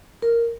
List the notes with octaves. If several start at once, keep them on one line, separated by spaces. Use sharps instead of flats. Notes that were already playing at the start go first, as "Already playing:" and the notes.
A#4